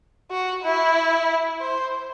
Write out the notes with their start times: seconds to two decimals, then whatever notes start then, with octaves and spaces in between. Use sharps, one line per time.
0.31 F#4
0.64 E4
1.61 C5